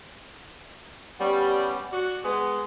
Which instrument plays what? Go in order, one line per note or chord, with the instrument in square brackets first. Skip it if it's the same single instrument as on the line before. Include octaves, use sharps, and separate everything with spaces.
[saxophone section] G3 [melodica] B3 C#4
[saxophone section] F#4 [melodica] D5
[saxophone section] G#3 B3 [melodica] G#4